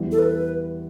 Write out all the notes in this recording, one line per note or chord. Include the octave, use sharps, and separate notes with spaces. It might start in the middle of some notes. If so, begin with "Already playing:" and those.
Already playing: E2 E3 G3
A4
B4